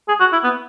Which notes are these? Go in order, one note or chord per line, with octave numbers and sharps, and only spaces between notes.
G#4
F#4
E4
B3